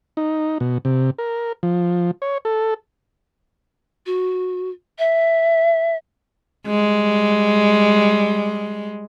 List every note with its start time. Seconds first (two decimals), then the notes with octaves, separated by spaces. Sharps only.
0.17 D#4
0.60 B2
0.85 C3
1.18 A#4
1.63 F3
2.22 C#5
2.45 A4
4.06 F#4
4.99 E5
6.67 G3 G#3